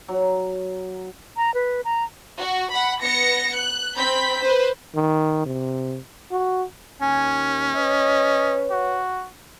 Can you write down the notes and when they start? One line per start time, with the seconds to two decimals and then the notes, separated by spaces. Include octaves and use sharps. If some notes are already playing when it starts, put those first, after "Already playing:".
0.08 F#3
1.37 A#5
1.54 B4
1.85 A#5
2.38 F#4
2.71 F#5 B5
3.01 B3 A#6 C#7
3.56 F#6
3.97 C4 B5 G6 B6
4.42 B4 C5
4.95 D#3
5.46 C3
6.32 F#4
7.02 D#2 C#4 G#5
7.76 B4 C#5 D#5
8.71 F#4